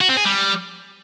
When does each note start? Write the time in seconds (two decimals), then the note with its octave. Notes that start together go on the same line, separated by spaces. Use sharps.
0.01 F#4
0.09 C4
0.17 G#4
0.25 G3